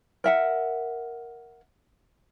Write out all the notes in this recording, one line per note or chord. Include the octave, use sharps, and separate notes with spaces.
A#4 E5 F#5